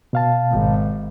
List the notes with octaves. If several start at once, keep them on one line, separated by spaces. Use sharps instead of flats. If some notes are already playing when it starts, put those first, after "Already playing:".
B2 F5 A5
G#1